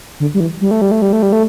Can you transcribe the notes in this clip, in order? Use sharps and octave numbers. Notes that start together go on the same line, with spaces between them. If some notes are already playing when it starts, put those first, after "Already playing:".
D3
G3
E3
G3
A3
G3
A3
G3
A3
G3
A3